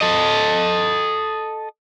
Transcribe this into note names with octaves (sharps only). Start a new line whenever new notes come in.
A4 D#5